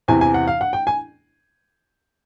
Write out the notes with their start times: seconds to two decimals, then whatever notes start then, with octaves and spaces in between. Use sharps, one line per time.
0.08 E2 C3 E3 G#5
0.21 G#5
0.34 F#5
0.47 F5
0.61 F#5
0.73 G5
0.87 G#5